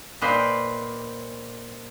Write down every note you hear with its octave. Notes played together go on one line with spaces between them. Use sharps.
A#2 A#3 D#4 B4 C5 G5